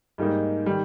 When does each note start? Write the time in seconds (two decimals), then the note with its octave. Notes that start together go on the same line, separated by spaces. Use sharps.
0.18 G#2 G3 A#3 D#4
0.66 D#3 G3